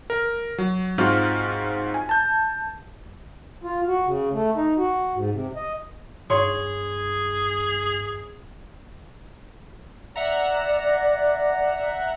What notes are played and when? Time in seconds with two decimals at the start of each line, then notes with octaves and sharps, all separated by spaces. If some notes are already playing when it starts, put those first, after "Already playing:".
0.10 A#4
0.58 F#3
0.98 G#2 C4 F4 F#4 F6
1.94 G#5
2.09 A5 G6
3.64 F4
3.88 F#4
4.06 C#3
4.33 A3
4.56 D#4
4.78 F#4
5.15 G#2
5.33 C3
5.56 D#5
6.30 G2 G#4 C#5 C6
10.16 D5 E5 F#5 A#5